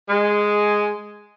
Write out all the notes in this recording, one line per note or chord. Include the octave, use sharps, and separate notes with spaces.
G#3